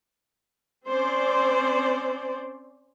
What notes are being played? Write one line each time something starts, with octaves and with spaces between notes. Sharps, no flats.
C4 C#4 C5 D5